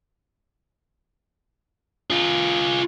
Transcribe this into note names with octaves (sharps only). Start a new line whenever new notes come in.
F4 G#4